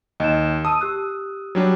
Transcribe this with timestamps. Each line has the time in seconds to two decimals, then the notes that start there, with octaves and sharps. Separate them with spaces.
0.20 D#2 D#5 E7
0.65 A5 D#6 E6 D#7
0.81 G4 E6 F#6
1.55 F#3 G3 D4